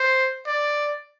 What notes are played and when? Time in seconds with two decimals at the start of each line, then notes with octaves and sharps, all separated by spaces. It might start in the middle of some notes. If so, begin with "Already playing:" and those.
Already playing: C5
0.46 D5